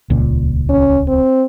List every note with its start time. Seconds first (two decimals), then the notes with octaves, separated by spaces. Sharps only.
0.10 D#1 C#2 A#2
0.69 C#4
1.08 C4